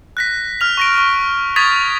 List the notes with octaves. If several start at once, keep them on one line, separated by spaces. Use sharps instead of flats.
F#6 A#6 B6
F6 F7
C#6 A#6 D7
C#6
C#6 D#6 G#6 A6 B6 F7